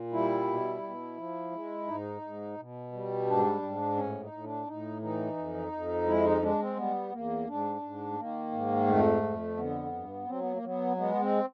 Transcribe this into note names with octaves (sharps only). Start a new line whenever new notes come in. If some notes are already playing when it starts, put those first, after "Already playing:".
Already playing: A#2
G3 E4
B2
B2
F3
G#3
G#2 D#4
G#2
B2
G3
G#2 D4
G#2
A2 C#4
D#4
A2
D4
A2 D#4
E3 D#4
F2
F2
G#3 E4
D#4
G#3 D4
C4
G3 B3
E2 A#3
G#2 D4
G#2
A3
D#3 A#3
G#2
F2 A3
F2
D3 B3
G2
F#3 C4
B3
A#3
F#3 B3
G#3 B3
C4